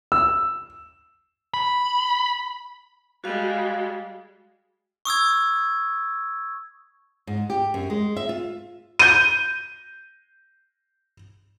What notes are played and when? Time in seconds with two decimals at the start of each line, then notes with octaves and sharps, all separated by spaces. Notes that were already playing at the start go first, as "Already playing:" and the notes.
0.12 E6
1.54 B5
3.24 G3 G#3 F#4 F5
5.05 C#6 D#6 E6 G#6
7.27 G#2
7.50 G4
7.74 F#2
7.90 G#3
8.17 E5
8.29 F4
8.99 G6 D#7